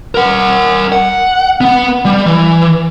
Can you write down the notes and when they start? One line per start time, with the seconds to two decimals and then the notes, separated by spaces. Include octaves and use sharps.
0.15 A#4 F#5
0.92 F#5
1.61 B3 F#5
2.05 G3
2.26 E3